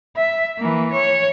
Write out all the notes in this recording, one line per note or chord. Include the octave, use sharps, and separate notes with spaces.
E5
E3 A#3
C#5